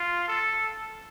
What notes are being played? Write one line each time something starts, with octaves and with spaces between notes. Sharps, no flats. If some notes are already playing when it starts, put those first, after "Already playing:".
Already playing: F4
A4